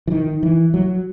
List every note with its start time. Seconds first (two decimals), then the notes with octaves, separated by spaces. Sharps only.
0.08 E3
0.11 D#3
0.43 E3
0.74 F#3